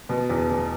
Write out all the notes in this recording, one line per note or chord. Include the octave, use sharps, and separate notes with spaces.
B2
E2
E2